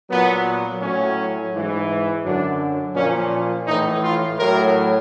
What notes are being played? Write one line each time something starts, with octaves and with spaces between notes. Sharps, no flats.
A#2 F#3 B3
A2 F#3 C#4
G#2 E3
F#2 D3 F#3 D4
A#2 F3 C#4
A2 E3 D#4
F4
A2 F#3 A#4